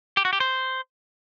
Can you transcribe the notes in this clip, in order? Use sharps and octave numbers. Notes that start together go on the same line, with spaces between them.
G4
F#4
G4
C5